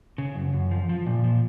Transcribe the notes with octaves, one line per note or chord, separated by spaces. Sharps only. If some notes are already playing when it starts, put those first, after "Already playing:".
C#3
F#2
F#2
F3
F3
A#2
F3